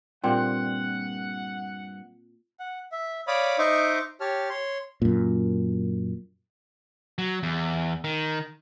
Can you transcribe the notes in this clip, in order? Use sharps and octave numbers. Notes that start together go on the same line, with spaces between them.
G2 A#2 G3 A#3 C4 F#5
F#5
E5
C#5 D5 F5 B5 D6 D#6
D#4 C5 D#5 E5 C#6 D6
G4 C#5 A5 F6
C#5 C6
F#2 A#2
F#3
E2
D#3